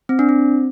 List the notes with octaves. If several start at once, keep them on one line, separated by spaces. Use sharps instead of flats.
C4
D4
C4